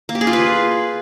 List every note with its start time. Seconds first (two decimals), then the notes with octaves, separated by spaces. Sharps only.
0.09 A#3
0.15 G4
0.21 G#4
0.27 F4
0.33 B4